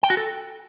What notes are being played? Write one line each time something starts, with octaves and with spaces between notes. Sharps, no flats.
G5
F#4
A4